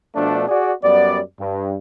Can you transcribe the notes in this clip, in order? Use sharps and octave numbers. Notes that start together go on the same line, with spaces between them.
B2 F3 A3 D4
F#4 G#4 D5
F#2 G3 B3 D5
G2